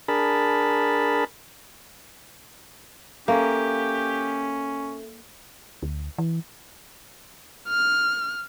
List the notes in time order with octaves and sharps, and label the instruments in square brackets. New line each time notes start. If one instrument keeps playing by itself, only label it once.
[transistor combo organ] D4 G#4 A#4 A5 B5
[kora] A#3 [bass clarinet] C#4 [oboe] G4 [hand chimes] A4 E5
[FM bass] D2
E3
[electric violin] F6